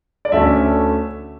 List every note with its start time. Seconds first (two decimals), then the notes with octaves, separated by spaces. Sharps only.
0.25 D5
0.32 D2 D3 A3 C#4 E5